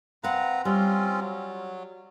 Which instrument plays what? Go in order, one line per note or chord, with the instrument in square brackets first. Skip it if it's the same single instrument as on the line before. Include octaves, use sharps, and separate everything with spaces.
[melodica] C4 B4 A#5 [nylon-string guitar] F5 F#5
[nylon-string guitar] G3 [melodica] C4 C#4 F4
[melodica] F#3